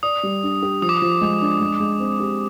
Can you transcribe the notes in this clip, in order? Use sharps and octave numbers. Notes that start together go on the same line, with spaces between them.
D5 D#6
G3
D4
G4
F3 D#6
D6
F3 D#6
G#3
D4
G#3
G#3
C4
G4